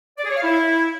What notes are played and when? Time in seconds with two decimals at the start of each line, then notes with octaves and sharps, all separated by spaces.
0.18 D5
0.24 G#4
0.30 C#5
0.36 F5
0.43 E4